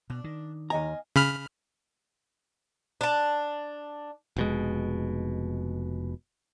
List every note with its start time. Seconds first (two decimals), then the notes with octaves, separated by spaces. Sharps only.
0.10 B2 D4
0.24 D#3
0.70 D#2 D#5 F5 G#5 A#5
1.16 C#3 B5 F6
3.01 D4 A5
4.36 F1 B2 G#3